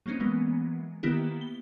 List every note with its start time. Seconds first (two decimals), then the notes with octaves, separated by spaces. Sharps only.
0.06 F#3 A#3 C4 C#4 D#4
0.20 E3 F#3 G#3 A#3 B3
1.03 D#3 A#3 B3 E4 G4
1.41 G7